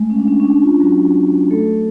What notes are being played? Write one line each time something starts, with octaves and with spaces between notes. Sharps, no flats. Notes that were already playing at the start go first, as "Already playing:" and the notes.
Already playing: G#3 A3
C#4
D4
C#4
C#4
D4
F4
F#3 F#4
A3 A4